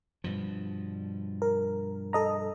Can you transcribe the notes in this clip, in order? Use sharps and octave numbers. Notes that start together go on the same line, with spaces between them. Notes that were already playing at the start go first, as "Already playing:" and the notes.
G2 B2 F3
A#4
A4 D#5 A#5